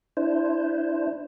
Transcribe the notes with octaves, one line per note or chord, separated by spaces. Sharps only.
D4 E4 C5